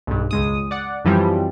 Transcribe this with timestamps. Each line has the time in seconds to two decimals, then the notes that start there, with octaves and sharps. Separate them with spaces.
0.07 B1 G2
0.31 C#2 G#3 D#6
0.71 D5 F#5
1.05 F#2 E3 F3 G3 C4